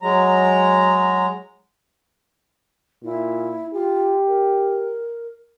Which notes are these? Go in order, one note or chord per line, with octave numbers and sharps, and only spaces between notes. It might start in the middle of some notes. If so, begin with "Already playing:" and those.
F#3 G#3 A#5
A#2 E4
F4 G4
A#4